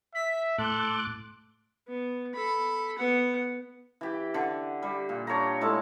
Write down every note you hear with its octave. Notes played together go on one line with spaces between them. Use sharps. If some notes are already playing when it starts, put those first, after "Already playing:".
E5 B6
A2 A4 C6 D6 F#6
B3
A4 B5
B3 F#5
E3 G4
D3
G3
A#2
D4 C#5 G5 A#5
A2 G#3 A4 A5